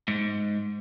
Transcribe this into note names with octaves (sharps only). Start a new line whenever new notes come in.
G#2